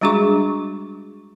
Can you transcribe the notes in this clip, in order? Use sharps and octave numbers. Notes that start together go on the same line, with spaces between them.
G3 G#3 D4 F#4 G#4 C#6